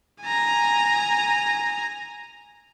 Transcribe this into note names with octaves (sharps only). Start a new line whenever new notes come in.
G#5 A#5